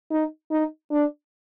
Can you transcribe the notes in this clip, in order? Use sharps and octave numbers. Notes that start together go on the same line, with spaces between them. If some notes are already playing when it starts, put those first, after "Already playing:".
D#4
D#4
D4